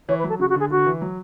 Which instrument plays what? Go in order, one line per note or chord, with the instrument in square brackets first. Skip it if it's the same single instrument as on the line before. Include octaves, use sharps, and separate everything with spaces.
[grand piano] E3 [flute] C#5
[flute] B4
[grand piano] F#3
[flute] A4
[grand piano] C#3 [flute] F#4
[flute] F#4
[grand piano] D3 [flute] G#4
[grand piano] D3 [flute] F#4
[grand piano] E3
F#3